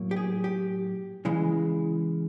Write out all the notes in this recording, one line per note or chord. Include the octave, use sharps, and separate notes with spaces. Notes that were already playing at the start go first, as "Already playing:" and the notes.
Already playing: A2 F#3 A#3
G4
G#4
G4
C#3 E3 G#3